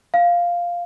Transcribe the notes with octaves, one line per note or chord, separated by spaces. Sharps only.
F5